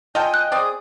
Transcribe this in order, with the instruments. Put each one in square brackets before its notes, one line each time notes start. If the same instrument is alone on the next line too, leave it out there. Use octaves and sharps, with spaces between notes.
[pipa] F4 A4 [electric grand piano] D#5 G5 [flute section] G#5 G6
[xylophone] F#6
[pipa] C4 D5 [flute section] G#4 D#6